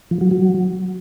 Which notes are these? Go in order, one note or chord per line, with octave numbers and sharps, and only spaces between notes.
F3
F#3
F#3